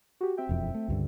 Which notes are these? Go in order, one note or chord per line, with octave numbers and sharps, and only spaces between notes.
F#4 G4
C4 E5 G5
E1 F2
A3
C#2 G2 D3